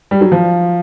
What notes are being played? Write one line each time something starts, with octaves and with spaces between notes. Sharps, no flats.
G3
F#3
F3